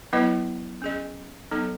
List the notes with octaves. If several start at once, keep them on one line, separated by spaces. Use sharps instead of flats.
F#3 B3 E4 B4 D#5
C#4 G#4 D#5
F#3 B3 D#4 A4 D#5